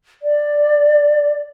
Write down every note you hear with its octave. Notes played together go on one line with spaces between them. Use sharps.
D5